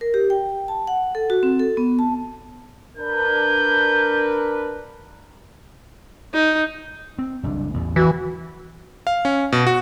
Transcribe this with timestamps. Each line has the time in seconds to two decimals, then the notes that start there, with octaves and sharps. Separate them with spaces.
0.01 A#4
0.14 G4
0.30 G5
0.68 A5
0.87 F#5
1.15 A4
1.30 F#4
1.43 C4
1.60 A4
1.77 B3
1.99 A5
2.97 D4 A#4 B4 G6
6.34 D#4
7.19 C4
7.43 F#1 C2 D4
7.74 A1 E2 A2
7.96 E3 F#4
9.07 F5
9.25 C#4
9.52 B2
9.67 F#4